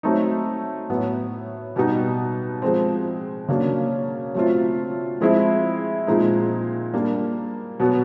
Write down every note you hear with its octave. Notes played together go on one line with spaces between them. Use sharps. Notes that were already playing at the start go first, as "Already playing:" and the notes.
F#3 A3 C4 D#4
A2 F#3 B3
B2 G3 B3 D#4
F3 G#3 C4
C#3 F#3 A#3 D4
F#3 A3 C4 F4
F3 G#3 C4 E4
A#2 F3 G#3 C4 D#4
G3 A#3 D4
B2 F#3 B3